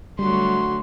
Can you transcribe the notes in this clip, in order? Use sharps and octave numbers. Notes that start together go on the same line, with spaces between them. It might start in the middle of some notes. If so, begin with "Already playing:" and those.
D3 F#3 G3 A3 F#4 C6